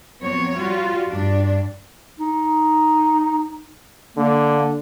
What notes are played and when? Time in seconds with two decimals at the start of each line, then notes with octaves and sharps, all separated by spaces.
0.20 F2 F#3 B3 C4 C#5
0.54 G3 F4 F#4
1.08 G2 D4
2.20 D#4
4.17 D3 A#3